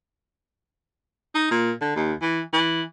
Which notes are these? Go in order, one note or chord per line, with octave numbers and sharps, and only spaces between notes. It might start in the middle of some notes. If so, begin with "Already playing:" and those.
D#4
A#2
D3
D#2
E3
E3